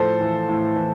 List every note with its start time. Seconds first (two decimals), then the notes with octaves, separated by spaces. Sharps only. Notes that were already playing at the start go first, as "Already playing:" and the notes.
Already playing: A2 F3 A4 C5
0.21 E3
0.49 A2
0.76 E3